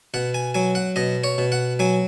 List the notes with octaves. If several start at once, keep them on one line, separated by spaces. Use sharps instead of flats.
B2 F#5
G#5
F#3 G#5
F#5
B2 D#5
C#5
B2
F#5
F#3 G#5